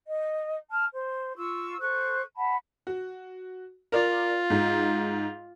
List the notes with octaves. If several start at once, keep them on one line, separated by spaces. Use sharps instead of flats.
D#5
A5 F6
C5
F4 C#6 E6
A4 C5 C#6 F#6
F#5 A5 B5
F#4
F4 A#4 D5
G#2